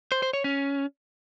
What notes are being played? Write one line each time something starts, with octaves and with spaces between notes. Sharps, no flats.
C5
C5
C#5
C#4